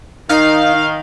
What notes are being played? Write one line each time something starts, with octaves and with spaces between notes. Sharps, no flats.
D#3 D#4 F5